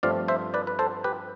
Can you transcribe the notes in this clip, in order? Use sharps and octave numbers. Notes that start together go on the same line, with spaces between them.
G2 F3 A3 C4 D5 F5
C5 E5
B4 D5
B4
A4 C5
G4 B4